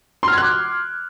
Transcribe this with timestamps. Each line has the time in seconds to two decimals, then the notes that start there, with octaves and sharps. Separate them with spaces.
0.23 C6
0.28 F6
0.33 G#6
0.38 F#6
0.43 D6